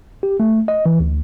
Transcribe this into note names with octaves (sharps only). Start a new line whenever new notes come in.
G4
A3
D#5
E3
D2